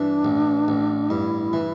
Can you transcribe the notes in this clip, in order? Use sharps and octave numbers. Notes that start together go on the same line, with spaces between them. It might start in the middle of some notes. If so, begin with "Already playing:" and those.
Already playing: G2 E3 D4
A1
A1
G2 E4
E3